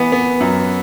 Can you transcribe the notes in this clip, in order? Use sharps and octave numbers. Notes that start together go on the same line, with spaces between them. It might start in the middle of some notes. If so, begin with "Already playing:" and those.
Already playing: E3 B3
B3
F#2